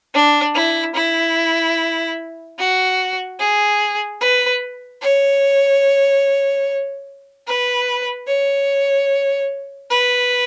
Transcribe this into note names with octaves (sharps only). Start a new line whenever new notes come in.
D4
E4
E4
F#4
G#4
B4
C#5
B4
C#5
B4